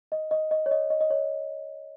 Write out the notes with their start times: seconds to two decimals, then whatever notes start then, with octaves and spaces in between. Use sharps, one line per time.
0.12 D#5
0.31 D#5
0.51 D#5
0.66 C#5
0.71 D#5
0.90 D#5
1.01 D#5
1.10 C#5